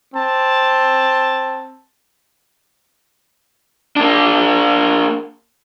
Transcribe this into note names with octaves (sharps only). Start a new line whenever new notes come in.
C4 A5
A#3 D4